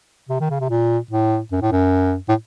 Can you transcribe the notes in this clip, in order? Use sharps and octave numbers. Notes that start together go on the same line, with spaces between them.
C3
D#3
C#3
C3
A#2
A2
F#2
A2
F#2
A2